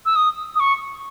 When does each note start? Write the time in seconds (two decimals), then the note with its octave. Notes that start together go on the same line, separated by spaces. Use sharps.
0.06 E6
0.16 D#6
0.56 D#6
0.60 C#6